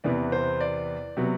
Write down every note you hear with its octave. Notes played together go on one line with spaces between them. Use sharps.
E2 C3 E3 B3 D5
C5
D5
C3 F#3 B3